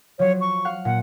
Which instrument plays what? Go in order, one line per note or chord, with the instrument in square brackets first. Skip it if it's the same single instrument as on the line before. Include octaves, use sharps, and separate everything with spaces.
[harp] F3 F#3 [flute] C#5
[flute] C#6
[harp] F5 F#5 F#6
[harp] A#2 [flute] F#5